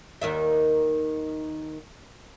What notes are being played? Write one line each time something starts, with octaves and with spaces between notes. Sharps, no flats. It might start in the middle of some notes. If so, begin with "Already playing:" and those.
D#2 D#3 E5